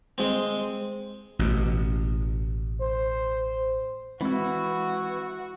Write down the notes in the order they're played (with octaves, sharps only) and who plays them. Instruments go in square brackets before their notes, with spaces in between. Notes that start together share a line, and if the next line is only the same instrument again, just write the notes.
[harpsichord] G#3 C4
[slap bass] A1 B2
[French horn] C5
[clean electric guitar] E3 E4 [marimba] G#3 C4 [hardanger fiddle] F#4